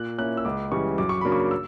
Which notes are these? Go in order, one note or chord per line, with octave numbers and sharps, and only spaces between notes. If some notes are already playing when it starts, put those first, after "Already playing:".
Already playing: A#2 F#6
A#3 C#4 E4 F#6
E6
C#2 D6
C#3 E3 G3 C#6
F#2 D6
C#6
C#3 F#3 A#3 D4 B5
C#6
E6